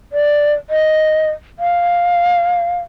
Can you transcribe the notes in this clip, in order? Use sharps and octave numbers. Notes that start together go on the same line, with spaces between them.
D5
D#5
F5